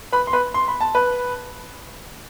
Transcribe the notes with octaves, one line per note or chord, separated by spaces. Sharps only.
B4 B5
C6
B4 B5
C6
B5
A5
B4 B5